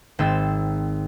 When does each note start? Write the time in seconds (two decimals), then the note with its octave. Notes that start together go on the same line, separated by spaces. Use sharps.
0.19 G#1 C4 E6 A6